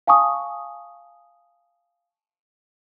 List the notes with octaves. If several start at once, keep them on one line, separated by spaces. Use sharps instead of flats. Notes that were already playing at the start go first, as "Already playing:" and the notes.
F5 G#5 A5 C#6 D#6